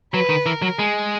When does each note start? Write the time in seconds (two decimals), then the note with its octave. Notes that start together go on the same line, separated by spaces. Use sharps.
0.13 F#3 B4
0.29 D#3
0.46 E3 A#4
0.62 F#3
0.78 G#3 G#4